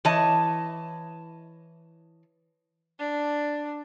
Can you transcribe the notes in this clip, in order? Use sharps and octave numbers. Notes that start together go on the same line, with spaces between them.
E3 C#5 D#5 A5
D4